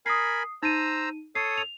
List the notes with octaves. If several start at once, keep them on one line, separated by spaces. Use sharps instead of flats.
A#4 G#5 B5 D#6 C7
D#4 C5 A#5 E6 D#7
A4 C#5 D#6 C7
F7